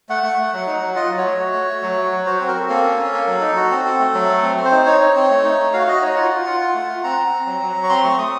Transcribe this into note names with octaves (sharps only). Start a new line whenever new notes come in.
A3 F#5
A3
A3
F#3
D#4
F#3
F4 D#5
F#3
C#5
A3
F#4
A3
A3
F#3
F#4
F#3
F#4 C5
C4 C5
A#4
C4 A4
A#3 A4
C#4
C#4
A#3
F#3
D#4
F#4
C4
C4
A3
F#3
A3
C4
C4
C5
D#4
D#4 C#5
D#4
C4
A3
D#4
A3
F#4 F5
F#4 D#5
D#4 C#5
F4 F#5
F4
F4
F4
A3
F4
C4 A#5
C4
C4
F#3
F#3
F#3
C#6
C4 C6
A3 C#6
A3 D#6